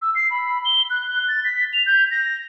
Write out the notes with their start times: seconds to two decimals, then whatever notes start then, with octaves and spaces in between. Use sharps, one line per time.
0.02 E6
0.15 C7
0.31 B5
0.65 G7
0.90 F#6
1.28 A6
1.44 B6
1.73 F7
1.86 G6
2.11 A#6